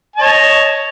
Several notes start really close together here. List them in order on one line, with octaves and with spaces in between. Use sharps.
A5 D#5 C#5